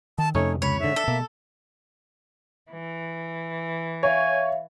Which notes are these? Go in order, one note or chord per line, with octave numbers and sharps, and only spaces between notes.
D#3 A5
F2 C3 A3 C#4 D#4 C#5
C#2 C#5 B5
G#2 D3 E5
D4 A4
B2 A#3
E3
C#5 E5 F5 G#5